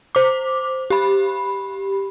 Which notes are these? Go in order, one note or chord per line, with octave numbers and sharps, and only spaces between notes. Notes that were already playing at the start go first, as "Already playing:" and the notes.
C5 D6
G4 B5